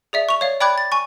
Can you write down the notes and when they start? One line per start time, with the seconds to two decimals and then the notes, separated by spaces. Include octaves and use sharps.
0.13 G#4 D5 E5
0.29 C#6 F7
0.41 C#5 D5 F5
0.60 D5 G5 B5 D6 F#6 G#6
0.78 A6
0.92 G#5 C#6